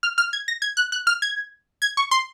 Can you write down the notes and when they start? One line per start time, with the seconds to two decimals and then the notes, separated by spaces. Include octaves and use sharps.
0.03 F6
0.18 F6
0.33 G#6
0.48 A#6
0.62 G#6
0.77 F#6
0.92 F#6
1.07 F6
1.22 G#6
1.82 G#6
1.97 C#6
2.11 C6